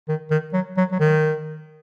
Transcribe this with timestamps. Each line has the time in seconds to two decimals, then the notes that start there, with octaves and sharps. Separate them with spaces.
0.09 D#3
0.31 D#3
0.53 F#3
0.77 F#3
0.92 F#3
1.00 D#3